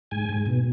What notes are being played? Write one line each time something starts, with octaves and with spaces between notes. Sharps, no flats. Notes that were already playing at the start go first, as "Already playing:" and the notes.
G#2 G#5
G#2
B2